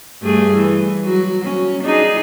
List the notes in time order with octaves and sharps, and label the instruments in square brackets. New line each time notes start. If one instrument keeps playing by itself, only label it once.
[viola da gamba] G2 A3 G#4
E3
F#3 F#4
C#4
D4 D#4 G#4